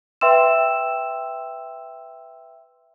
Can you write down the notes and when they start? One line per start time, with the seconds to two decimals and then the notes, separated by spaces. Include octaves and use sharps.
0.21 B4 E5 G5 C6 E6 E7